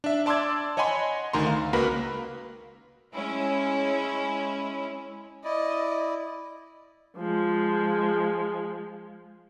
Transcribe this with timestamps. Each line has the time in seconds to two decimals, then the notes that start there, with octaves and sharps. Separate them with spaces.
0.04 D4 E5
0.26 D5 A5 C6 D6 E6 G#6
0.77 C#5 D#5 F#5 G#5 B5 C6
1.33 D2 D#3 A#5 C6
1.46 F5
1.73 C#2 A#3 F#4 A#4 B4 B5
3.14 G#3 C#4 E4
5.45 E4 D5 D#5
7.18 F3 G#3